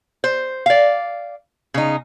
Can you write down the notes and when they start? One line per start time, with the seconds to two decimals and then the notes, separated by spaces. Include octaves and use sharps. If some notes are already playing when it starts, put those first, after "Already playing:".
0.24 C5
0.66 D5 F5
1.74 C#3 D#4